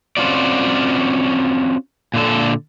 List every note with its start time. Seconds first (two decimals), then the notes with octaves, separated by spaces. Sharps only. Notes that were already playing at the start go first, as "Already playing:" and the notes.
0.17 C4 C#4 F4 F#4 D5
2.14 A#2 D3 A4